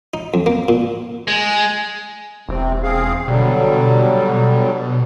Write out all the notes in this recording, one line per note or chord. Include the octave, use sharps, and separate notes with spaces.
D#4
F2
A#3
A#2
G#3
E1 C3 C4
C4 G#4 F5
B2 D3 F#3 G3
B2